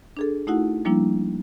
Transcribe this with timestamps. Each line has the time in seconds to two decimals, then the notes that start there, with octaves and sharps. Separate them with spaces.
0.17 D4 G#4 A4
0.47 A3 D#4 E4 F#4 F#5
0.85 F3 G3 A#3 D4 E4